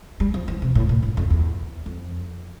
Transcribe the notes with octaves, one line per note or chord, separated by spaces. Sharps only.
G3
F3
E3
C3
A2
A#2
G2
F2
E2
F2